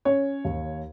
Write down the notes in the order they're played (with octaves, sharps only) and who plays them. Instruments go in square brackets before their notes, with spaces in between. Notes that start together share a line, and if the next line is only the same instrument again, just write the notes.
[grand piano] C#4 [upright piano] C#5
[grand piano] D#2